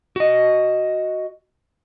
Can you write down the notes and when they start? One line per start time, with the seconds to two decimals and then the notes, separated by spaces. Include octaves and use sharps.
0.16 F#4 D#5